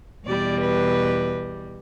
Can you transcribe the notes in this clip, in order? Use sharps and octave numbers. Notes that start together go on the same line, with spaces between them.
E2 B2 G3 D5
B4